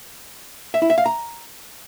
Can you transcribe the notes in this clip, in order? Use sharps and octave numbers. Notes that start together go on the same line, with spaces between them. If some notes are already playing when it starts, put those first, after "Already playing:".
E5
E4
E5
F5
A#5